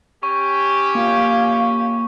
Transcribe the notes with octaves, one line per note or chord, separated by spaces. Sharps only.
C#4 G4 C#6
A#3 F4 F5